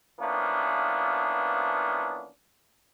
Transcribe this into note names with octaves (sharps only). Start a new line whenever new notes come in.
E3 F3 A#3 B3 C#4 D4